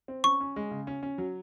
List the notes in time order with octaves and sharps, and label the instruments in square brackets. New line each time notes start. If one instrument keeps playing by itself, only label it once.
[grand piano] C4
[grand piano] C#4 [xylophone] C#6
[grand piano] C#4
G#3
C#3
C#4
C#4
F#3